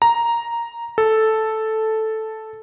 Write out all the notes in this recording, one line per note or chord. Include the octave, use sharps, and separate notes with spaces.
A#5
A4